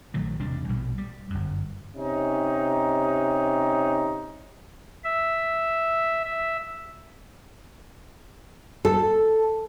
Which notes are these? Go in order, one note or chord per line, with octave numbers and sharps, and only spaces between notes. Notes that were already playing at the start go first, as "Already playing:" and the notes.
A#1 D#3 F#3 A3
E1 C3 G3 D4
A#1 B2 G3
G3
G1 F#2
C3 C#4 D#4
E5
E5
A4